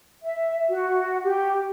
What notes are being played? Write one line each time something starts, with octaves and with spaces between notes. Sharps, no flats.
E5
F#4
G4